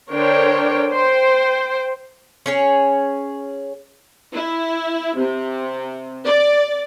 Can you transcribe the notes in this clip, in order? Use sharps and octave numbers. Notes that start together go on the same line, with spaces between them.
D3 D4 A#4 C5 C#5 G5
C5 G5
C#4 G#4 C#5
E4
C3
D5